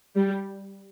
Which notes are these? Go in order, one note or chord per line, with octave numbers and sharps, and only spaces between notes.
G3